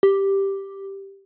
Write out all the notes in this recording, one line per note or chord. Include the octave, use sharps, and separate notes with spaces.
G4